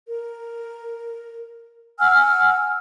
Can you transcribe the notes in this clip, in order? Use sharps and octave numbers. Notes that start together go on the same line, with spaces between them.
A#4
F#5 G#5 E6 F6